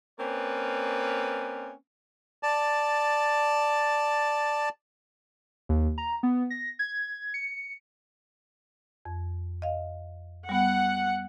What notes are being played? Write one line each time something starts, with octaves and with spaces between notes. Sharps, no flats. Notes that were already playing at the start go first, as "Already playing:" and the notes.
A#3 C4 C#4 B4 D5
D5 A5
D#2
A#5
B3
A#6
G#6
C#7
F2
D#5 F5
G3 B3 F#5